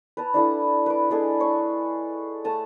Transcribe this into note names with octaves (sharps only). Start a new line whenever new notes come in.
B4 A5 A#5
D4 E4 A4 F#5
B4 D6
G#3 D4 G#4 A4
C#5 C#6
A3 A5 D#6